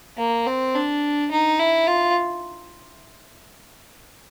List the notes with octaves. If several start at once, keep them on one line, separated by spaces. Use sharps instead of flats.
A#3
C4
D4
D#4
E4
F4